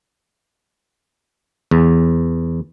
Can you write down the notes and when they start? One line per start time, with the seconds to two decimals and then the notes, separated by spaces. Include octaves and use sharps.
1.71 E2